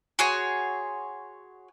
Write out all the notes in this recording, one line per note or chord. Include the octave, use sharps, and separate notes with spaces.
F#4 G#4 C#5 C6